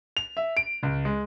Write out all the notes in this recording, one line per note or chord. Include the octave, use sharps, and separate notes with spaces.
F7
E5
D7
C#2
G#3